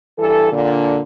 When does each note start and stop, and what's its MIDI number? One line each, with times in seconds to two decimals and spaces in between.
0.19 0.51 43
0.19 0.51 52
0.19 0.51 69
0.52 0.99 46
0.52 0.99 50